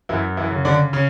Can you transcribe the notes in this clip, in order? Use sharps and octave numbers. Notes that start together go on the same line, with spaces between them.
F#2 E3 E4
E3 E4
C#3
D3 D4
C#3 C#4